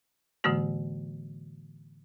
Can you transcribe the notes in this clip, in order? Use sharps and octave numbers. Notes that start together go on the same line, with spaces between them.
A2 D3 E3 G#3 A#3 F#4